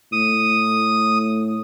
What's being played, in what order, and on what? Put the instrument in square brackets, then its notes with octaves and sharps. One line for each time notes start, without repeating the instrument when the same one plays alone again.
[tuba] A2 [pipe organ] D#6